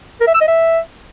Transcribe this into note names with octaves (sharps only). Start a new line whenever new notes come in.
A#4
E5
E6
D#5
E5